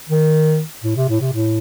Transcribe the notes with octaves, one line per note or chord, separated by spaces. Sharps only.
D#3
A2
C3
A2
C3
A2